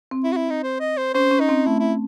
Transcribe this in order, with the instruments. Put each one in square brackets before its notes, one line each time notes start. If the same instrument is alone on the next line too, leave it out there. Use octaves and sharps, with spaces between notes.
[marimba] C4
[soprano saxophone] E4
F#4
E4
D#4
C5
D#5
C5
[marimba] C#4 [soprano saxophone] C5
[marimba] C#4
[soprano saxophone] D#4
[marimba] C4
[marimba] A3 [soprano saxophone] E4
[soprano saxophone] E4